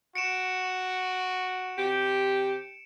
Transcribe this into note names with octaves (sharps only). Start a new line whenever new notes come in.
F#4 C#7 D7 E7
C3 G4